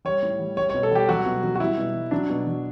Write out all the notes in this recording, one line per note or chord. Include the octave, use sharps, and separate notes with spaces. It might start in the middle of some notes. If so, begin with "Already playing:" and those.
G3 C#5
A2
G3
G3 C#5
C#5
B2
A4
G3 G4
F#3 F#4
B2
F#3
F#4
G3 E4
B2
G3
F#3 D4
B2
F#3